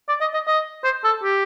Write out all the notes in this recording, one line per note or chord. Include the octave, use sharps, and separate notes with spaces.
D5
D#5
D#5
D#5
C5
A4
G4